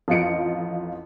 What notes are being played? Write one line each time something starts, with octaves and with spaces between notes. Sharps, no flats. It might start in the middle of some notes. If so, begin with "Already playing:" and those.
A1 F2 F4 D#5 C#7 D7